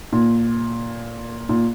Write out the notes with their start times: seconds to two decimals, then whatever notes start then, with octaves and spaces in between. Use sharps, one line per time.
0.12 A#2
1.49 A#2